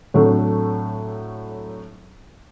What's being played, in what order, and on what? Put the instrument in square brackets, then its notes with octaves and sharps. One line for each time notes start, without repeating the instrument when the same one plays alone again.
[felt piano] A2 F#3 A3 C4 D4